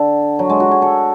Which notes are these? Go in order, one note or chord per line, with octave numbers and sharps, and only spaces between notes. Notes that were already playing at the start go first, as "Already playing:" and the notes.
Already playing: D3
F#3
G#3
F#4
G#4
A4